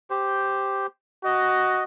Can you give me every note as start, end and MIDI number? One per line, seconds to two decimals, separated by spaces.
0.10 0.87 67
0.10 0.87 72
1.24 1.84 66
1.24 1.84 75